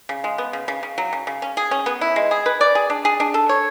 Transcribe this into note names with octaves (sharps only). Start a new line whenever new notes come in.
C#3
G#3
B3
C#3
C#3
C#3
F#3
C#3
C#3
C#4
G#4
C#4
B3
E4
G#3
G#4
B4
D5
G#4
D4
G#4
D4
A4
C#5